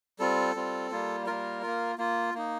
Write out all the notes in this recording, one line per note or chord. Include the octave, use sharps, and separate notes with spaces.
G3 C4 F4 A4
G3 C4 F4
G3 A#3 F4
G3 A#3 F4 A#4
A#3 F4
A#3 F4
A#3 D#4